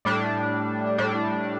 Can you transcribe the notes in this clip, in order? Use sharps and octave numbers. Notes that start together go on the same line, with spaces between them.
A2 G3 D4
A2 G3 D4